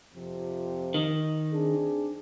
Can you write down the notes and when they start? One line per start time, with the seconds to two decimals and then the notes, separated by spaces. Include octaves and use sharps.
0.14 F2 C3 F3
0.94 D#3
1.51 C4 D4 G#4